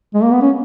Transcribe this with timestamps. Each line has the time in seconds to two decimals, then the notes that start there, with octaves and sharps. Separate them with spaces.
0.14 G#3
0.23 A#3
0.33 B3
0.42 C#4